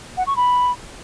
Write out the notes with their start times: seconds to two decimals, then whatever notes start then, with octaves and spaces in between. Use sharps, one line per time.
0.17 F#5
0.27 C#6
0.36 B5